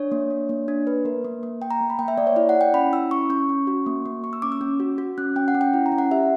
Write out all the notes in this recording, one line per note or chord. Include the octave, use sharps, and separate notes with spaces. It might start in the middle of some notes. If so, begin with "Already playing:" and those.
Already playing: D4 C#5
A#3
D4
A#3
D4
A#3 B4
A#3 A#4
A#3
A#3
A#3 G5
A#5
A#3
B5
A#3 G5
E5
A#3 D5
C#5
E4 D5
F#5
E4
G5
C#4 B5
E4 E6
C#4 C#6
C#4 C#6
C#4
F#4
A#3
A#3
A#3 C#6
E6
C#4 D6
E6
C#4
F#4
F#4
C#4 F#6
C#4 G5
F#5
C#4
G5
E4
A#5
C#4
F#5
G4 E5